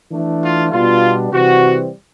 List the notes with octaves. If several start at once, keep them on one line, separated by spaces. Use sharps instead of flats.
E3 A3 D4
F4
B2 G3 B3 D4 F4
C3 E3 G3 C4 F#4